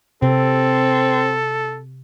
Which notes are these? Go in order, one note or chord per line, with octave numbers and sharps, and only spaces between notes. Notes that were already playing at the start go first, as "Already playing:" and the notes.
C3 C4 A4